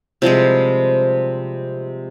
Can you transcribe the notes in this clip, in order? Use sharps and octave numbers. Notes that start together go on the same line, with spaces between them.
C3 F3 G3 G#3